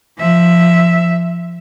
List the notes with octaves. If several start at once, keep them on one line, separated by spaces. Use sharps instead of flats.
F3 E5